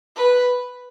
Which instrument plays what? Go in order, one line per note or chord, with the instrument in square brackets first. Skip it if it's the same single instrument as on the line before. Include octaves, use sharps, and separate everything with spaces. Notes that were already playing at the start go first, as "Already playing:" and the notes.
[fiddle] B4